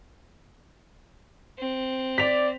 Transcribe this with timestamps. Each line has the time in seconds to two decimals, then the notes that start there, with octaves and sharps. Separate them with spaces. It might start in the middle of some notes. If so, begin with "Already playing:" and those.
1.58 C4
2.18 D5 B6 F7